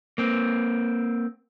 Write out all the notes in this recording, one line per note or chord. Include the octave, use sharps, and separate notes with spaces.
A#3 C4